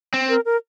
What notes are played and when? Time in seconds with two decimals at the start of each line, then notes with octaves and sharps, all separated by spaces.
0.14 C4
0.29 A#4
0.45 A#4